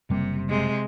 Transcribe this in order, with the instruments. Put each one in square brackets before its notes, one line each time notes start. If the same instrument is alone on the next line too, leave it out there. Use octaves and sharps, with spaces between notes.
[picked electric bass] F#1 G3 A#3 [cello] C3
[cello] C3 G#3